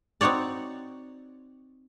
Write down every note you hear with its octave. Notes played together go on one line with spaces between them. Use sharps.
C4 D#4 F#4 C#5 D5